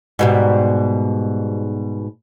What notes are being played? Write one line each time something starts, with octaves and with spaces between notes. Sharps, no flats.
G#2 B2 G3